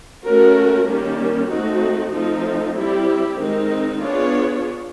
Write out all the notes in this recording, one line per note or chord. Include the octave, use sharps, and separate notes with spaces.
A3 C#4 F#4 A#4
D#3 G3 A#3 C#4
A3 C4 D#4 F#4
F3 A3 C4 D#4
G3 C4 E4 G4
D#3 G#3 C4 D#4
B3 D4 F4 G#4 C#5